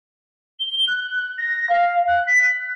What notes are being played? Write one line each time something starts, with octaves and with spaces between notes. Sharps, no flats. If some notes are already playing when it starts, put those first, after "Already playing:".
G7
F#6
A#6
F5
F#6
B6
F#6